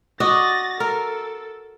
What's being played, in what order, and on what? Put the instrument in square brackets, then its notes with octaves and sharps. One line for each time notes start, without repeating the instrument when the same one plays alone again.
[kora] F#4 D5 D#5 [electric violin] A6 A#6
[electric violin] A4 [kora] A#4